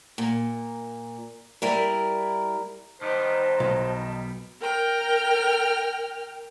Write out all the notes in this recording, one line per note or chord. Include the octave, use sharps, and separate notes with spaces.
A#2
G3 E4 A#4
D#3 G3 B3 D#4 C5 D#5 A5
B1
A#4 G5 F6